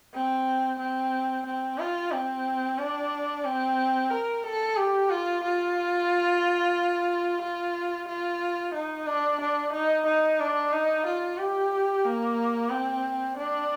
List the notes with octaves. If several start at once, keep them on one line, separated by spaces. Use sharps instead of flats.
C4
C4
C4
F4
C4
D4
C4
A#4
A4
G4
F4
F4
F4
F4
D#4
D4
D4
D#4
D#4
D4
D#4
F4
G4
A#3
C4
D4